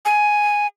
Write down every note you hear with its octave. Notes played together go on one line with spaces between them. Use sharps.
G#5